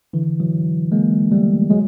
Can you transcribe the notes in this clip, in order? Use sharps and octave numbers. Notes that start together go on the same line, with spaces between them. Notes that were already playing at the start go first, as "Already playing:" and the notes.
D3 E3
E3 F#3
G#3 A#3
G3 A3
F#3 G#3